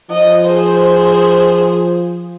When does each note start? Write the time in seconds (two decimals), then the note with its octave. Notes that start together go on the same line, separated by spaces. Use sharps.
0.11 F3 D#5
0.46 G#4 C5